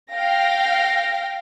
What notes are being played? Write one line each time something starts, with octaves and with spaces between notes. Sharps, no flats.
F5 G5 A#6